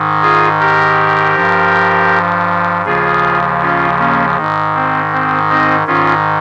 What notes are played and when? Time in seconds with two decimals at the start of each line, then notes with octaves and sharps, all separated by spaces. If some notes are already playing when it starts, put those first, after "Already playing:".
Already playing: G#2 D#3
0.22 F4 G#4
0.60 G4 A#4
1.35 G2 F3
2.86 D#2 C#3 F3 F4 G#4
3.61 C#4 F4
3.99 A#3 C#4
4.37 G#2 D#3
4.75 C4
5.13 C4
5.50 C4 D#4
5.87 G#2 D#3 C#4 F4